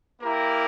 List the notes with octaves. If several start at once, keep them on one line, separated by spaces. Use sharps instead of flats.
A#3 E4 G4 A#4